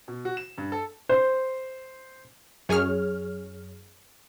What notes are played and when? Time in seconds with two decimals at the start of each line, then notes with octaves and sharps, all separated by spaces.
0.08 B2
0.25 F#4
0.37 E7
0.58 G2
0.72 A4
1.09 C5
2.69 F#2 G#4 C#5 F6